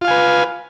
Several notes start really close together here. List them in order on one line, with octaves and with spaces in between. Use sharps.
F4 F5 G#5 B4